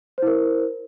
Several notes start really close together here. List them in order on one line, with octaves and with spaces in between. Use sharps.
C5 E4 A#4